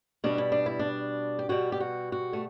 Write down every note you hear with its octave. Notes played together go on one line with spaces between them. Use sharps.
B2 G3 D4
E4
D4
E4
D4
G4
B2 G3 F#4
G4
F#4
F#4
A3